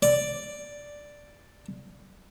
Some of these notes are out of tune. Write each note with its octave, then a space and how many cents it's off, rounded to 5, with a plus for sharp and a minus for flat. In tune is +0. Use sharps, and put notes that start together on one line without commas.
D5 +0